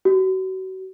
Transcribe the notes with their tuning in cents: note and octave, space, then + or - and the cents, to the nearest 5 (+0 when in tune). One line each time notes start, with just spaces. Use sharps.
F#4 +35